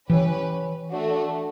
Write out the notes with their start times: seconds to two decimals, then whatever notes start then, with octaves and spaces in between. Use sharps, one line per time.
0.09 E3 C#4 G4 B4
0.90 A3 D4 F#4